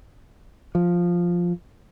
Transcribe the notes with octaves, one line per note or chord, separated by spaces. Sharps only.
F3